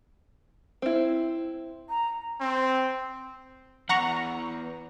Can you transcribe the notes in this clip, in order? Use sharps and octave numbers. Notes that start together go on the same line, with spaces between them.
C4 E4
A#5
C4
E2 F#5 A#5 C#6